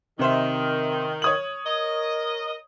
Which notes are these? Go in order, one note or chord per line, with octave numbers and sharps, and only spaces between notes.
C3 D#3 C5 E5
C#5 D#6 F#7
A#4 D#5